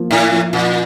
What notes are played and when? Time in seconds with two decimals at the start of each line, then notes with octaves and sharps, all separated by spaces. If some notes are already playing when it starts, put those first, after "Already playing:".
Already playing: F3 A#3
0.10 A2 E4
0.32 F3
0.53 A#2 F3